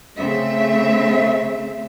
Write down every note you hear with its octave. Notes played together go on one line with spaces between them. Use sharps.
C#3 A3 C4 E5